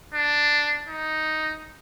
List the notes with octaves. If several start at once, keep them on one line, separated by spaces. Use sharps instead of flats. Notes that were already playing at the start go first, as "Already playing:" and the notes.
D4
D#4